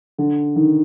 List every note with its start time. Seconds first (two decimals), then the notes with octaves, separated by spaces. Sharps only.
0.18 D3
0.56 D#3